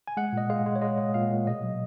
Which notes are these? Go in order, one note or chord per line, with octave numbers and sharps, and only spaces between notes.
G#5
G#3 F#5
A#2 D#5
G#3 F5
G#3
C#5
G#3 D#5
G#3
A#2 F5
A#2
B2 D#5
F#3